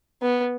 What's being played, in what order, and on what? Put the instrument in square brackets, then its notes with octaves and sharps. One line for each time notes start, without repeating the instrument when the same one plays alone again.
[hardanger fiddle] B3